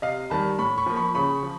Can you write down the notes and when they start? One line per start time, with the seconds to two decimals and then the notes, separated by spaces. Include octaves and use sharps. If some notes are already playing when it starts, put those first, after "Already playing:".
0.02 C3 D#5 F5
0.30 D#3 G3 A5 B5
0.59 A2 B5 C#6
0.78 B5 C#6
0.86 F3 A#3
0.96 B5 C#6
1.15 C#3 B5 C#6
1.43 F3